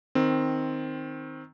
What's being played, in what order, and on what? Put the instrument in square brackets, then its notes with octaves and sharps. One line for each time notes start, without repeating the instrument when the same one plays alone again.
[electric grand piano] D#3 C4